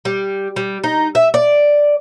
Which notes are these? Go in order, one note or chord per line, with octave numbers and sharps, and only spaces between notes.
G3
G3
D#4
E5
D5